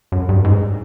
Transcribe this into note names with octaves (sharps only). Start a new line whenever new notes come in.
F#2
G2
G#2